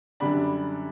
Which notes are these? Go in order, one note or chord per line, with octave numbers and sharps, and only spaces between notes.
F#2 D3 G3 D4 B5